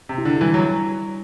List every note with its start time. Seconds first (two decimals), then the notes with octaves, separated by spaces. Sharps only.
0.09 C3
0.18 E4 G4
0.25 D3
0.41 E3 G3
0.54 F#3